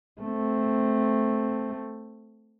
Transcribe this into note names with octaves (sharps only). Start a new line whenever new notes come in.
A3 C4